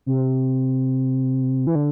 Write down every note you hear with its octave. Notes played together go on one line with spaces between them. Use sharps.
C3
E3
D3